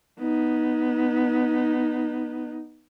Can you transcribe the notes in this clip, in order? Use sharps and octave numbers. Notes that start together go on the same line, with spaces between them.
B3 D#4